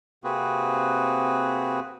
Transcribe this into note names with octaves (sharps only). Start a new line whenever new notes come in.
C3 A#3 C4 F#4 G#4 B4